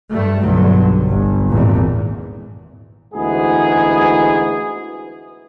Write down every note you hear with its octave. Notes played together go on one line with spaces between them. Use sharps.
G2 G3 A3
B1 G2 D3 F#3
G1
G#1 E2 A#2
D2 G#2 E3 G#3 B3 G#4